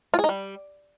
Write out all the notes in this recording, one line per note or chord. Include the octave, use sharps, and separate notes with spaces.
F4
G#4
D#4
G3